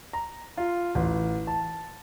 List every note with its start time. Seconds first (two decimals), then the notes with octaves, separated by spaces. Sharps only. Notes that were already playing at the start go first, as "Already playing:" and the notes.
0.13 A#5
0.57 F4
0.95 A1
1.47 A5